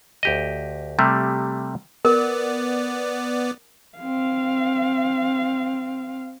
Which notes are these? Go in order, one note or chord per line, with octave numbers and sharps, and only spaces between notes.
D2 G4 D#5
C3 G3 A3
B3 A#4 D5
C4 F5